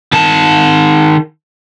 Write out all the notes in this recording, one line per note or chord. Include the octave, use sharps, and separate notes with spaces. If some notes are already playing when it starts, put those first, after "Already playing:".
D#3 A5